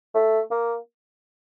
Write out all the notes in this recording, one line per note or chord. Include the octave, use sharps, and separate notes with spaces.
A3
A#3